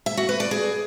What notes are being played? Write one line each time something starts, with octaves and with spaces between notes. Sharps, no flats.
E5
F#4
B4
D5
G#4